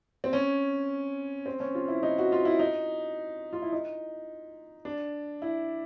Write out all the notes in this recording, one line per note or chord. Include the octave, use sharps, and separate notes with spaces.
C4
C#4
C4
C#4
F4
E4
D#4
F#4
F4
E4
D#4
F4
E4
D#4
D4
E4